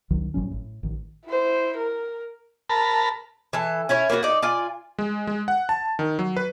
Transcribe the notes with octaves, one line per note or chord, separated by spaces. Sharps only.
C2 D#3 F#3
G#1 A2 F#3 C#4
A2
A1 D#3
E4 C5
A#4
A#4 A5 B5
E3 A4
C#4 E4 C#5
A#3 B3 F4 F#4
D#4 D5
F4 D5 G#5
G#3
G#3
F#5
A5
D#3
F#3
B4